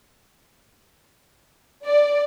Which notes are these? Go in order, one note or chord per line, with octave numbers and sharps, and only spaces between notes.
D5